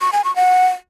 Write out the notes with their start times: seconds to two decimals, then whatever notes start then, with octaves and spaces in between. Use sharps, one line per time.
0.01 C#6
0.13 G#5
0.24 C#6
0.36 F#5